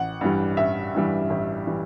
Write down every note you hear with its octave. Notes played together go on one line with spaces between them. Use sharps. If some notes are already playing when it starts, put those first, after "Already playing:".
Already playing: A1 F#5
G2 E3 G3
A1 E5
G2 E3 G3
A1
E3 G3